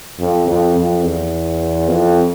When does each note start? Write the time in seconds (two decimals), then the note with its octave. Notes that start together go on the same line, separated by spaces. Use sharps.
0.20 F2
0.48 F2
0.76 F2
1.04 E2
1.88 F2